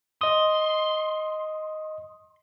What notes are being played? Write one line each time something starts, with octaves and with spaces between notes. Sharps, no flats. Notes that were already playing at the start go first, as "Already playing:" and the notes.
D#5 C6 D#6